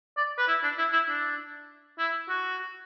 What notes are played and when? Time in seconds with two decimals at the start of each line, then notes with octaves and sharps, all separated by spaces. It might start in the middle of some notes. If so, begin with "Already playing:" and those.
0.17 D5
0.38 B4
0.48 E4
0.63 D4
0.78 E4
0.93 E4
1.08 D4
1.99 E4
2.29 F#4